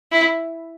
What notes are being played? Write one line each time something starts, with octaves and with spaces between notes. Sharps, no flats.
E4